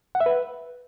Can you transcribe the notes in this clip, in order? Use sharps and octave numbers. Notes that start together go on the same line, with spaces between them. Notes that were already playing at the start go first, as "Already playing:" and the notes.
F#5
E5
B4